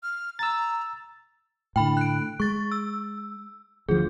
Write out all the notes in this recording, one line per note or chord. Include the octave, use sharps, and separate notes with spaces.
F6
A#5 E6 A6
A2 D3 G5 B5
F#6 D7
G#3 C#6 A6
E6
D2 F3 G#4